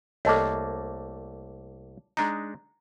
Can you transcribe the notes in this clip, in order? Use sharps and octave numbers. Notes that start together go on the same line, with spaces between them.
C2 A3 A#3 A4 C#5 D#5 A5 D6
G#3 D4 D#4 A#5